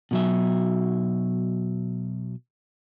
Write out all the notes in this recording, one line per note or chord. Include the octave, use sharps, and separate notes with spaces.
B2 F#3 E5